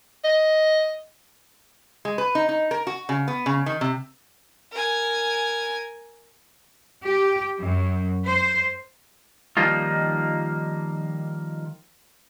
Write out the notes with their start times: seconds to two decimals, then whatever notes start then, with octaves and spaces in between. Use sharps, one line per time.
0.24 D#5
2.05 G#3
2.18 B4
2.35 D#4
2.49 D#4
2.71 A#4
2.87 F#4
3.09 C#3
3.28 B3
3.46 C#3
3.66 D#3
3.81 C3
4.72 A#4 G#5
7.05 G4
7.61 F#2
8.26 C5
9.57 D#3 F3 G3 A#3 D#4 F4